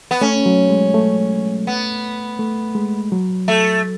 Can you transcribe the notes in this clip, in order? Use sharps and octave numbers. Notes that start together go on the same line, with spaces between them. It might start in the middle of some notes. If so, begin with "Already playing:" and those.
B3
A3 C#4
F#3
G#3
A3
B3
A3
G#3
F#3
A3